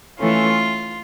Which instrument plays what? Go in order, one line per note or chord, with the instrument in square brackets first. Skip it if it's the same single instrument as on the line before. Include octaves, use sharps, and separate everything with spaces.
[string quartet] E3 A3 C#4 F4